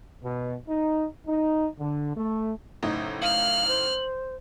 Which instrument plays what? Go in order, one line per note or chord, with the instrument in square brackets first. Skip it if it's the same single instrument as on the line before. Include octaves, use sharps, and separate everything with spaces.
[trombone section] B2
D#4
D#4
D3
A3
[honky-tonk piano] F#1 A2 D#4
[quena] F5 [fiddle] F6 [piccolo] F#7
[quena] C5